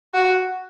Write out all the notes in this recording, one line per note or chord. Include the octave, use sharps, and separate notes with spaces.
F#4